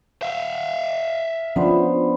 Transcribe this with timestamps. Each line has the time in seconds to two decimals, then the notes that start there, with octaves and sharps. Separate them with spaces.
0.22 E5 F5
1.56 F3 B3 C#4 D4 C5